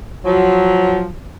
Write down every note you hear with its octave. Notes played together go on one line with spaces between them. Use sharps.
F3 F#3